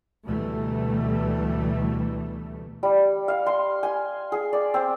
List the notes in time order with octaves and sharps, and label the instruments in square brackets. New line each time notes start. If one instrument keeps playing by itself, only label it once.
[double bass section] D2 B2 E3 G3 A3
[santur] G3
F5
C6
G#5
G#4
D5
C4